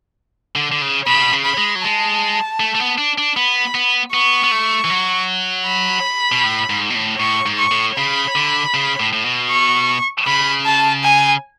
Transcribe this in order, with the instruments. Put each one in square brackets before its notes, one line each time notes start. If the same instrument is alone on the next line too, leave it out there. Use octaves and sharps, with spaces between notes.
[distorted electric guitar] D3
D3
C#3
[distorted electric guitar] B2 [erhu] B5
[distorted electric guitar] C#3
B2
C#3
[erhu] B5
[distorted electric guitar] G#3
F#3
[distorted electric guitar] G#3 [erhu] A5
[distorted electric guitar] A3
A3
B3
D4
D4
[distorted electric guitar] B3 [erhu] B5
[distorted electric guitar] B3
[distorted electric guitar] B3 [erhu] C#6
[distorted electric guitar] B3
A3
E3
F#3
[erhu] B5
[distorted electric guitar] B2
A2
G#2
B2
A2
[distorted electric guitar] A2 [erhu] C#6
[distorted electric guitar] G#2
[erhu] C#6
[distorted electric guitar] A2
[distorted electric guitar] C#3 [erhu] B5
[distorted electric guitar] D3
C#3
A2
A2
B2
[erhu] C#6
[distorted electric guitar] C#3 [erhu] B5
[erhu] A5
G#5